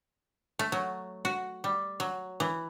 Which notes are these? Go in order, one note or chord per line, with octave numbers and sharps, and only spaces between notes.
A3
F#3
F#4
G3
F#3
E3